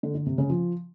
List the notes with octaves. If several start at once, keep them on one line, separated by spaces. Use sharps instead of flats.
D3
D3
C3
C#3
F3